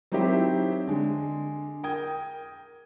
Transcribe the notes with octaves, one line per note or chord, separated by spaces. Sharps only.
F#3 C4 D#4 E4 G4
D3 G#3
A#4 G5 D#6 G#6